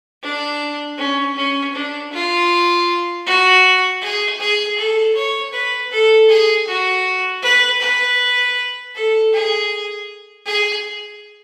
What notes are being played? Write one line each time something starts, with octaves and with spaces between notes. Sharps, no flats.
D4
C#4
C#4
D4
F4
F#4
G#4
G#4
A4
C#5
B4
A4
G#4
F#4
B4
B4
A4
G#4
G#4